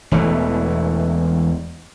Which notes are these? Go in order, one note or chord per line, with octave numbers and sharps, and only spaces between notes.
E1 E2 E3 A3